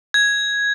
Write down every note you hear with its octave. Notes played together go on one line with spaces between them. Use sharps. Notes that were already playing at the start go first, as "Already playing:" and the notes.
G#6